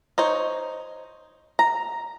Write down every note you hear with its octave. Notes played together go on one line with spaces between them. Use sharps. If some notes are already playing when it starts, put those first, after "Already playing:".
D#4 C5 C#5
A#5